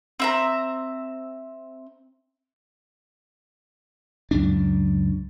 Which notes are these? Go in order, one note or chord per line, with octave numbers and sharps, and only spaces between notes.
C4 E5 A#5
C#2 F#2 D4